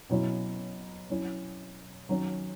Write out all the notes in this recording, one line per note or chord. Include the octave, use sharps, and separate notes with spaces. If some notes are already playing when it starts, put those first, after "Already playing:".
B2 F#3 C#4 E4
F#3 C#4 E4
D#3 F#3 C#4